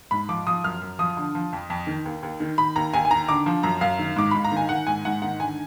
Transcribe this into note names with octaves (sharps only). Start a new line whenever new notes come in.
G#2 B5
F3 D6
F3 D#6
F#2 F6
F#2
F3 D#6
D3
F3
F2
F2
D#3
D#2
D#2
D#3
D#3 B5
D#2 A#5
D#2 G#5
G#5
D#3 A#5
D3 D6
F3
F#2 A#5
F#2 F5
D#3
G#2 D6
G#2 B5
A#5
D#3
G#5
D#3 F#5
G#2 G#5
G#2 F#5
D#3 F#5
D3 G#5